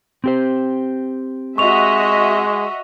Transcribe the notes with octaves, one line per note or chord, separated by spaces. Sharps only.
C4 G4 C5
G#3 F#4 D#5 E5 C#6 F7